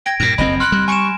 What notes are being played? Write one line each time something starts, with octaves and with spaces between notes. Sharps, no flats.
G5 G#6 A#6 D7
G2 A#2 A#6 D7
F#1 F2 C4 D#5 B5
C6 F6 F#6
G3
G#5 C#6 D7 E7